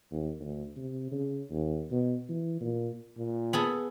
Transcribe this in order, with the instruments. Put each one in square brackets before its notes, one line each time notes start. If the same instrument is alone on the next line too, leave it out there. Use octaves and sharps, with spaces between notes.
[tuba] D#2
D2
C3
C#3
D#2
B2
E3
A#2
[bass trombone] A#2
[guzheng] B3 G#4 A4